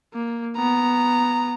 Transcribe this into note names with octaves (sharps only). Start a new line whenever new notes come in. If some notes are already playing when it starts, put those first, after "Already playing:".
A#3
B3 A#5